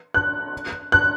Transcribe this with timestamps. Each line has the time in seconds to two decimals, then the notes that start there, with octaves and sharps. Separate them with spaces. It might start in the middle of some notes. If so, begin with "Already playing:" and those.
0.14 F#6
0.92 F#6